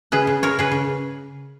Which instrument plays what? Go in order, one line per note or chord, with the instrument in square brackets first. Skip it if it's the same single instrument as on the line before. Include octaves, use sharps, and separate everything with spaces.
[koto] C#3 G#4 B4
C#3
C#3 A#4 C#5
C#3 G#4 B4
C#3